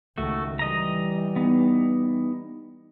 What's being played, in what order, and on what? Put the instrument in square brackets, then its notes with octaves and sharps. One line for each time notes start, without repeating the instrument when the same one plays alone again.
[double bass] C#2 D#3 [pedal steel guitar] A3 F#4
[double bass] E3 G3 [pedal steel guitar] D#5 A#5
[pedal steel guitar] B3 D#4